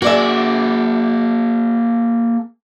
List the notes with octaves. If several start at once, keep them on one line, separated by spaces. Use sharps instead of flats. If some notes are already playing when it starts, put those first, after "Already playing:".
A#3 F#4 G#4 D5 E5